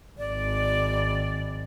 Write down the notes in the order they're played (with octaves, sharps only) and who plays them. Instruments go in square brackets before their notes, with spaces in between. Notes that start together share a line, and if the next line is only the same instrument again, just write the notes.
[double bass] G#1 [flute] D5